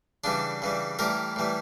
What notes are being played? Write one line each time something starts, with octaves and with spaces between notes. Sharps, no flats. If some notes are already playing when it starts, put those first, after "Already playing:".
C#3 E3 G3 D4
C#3 E3 G3
A2 E3 G3 G4 A#4
A2 E3 G3